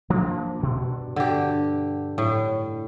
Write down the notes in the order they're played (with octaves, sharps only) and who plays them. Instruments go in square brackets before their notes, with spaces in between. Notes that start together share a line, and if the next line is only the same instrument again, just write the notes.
[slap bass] F3 A#3 D4
G2 B2
[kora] D3 G4
A2